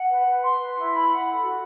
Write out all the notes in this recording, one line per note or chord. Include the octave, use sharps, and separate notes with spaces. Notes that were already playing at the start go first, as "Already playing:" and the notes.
Already playing: F#5
B4
B4
C6
B4
E4
B5
F#5
A4
F#4